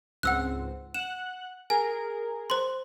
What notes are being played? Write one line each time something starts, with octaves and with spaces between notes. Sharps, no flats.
C#2 G#2 C4 F#5 E6 F#6
F#5 F#6 E7
G#4 A#4 G#5
C5 C6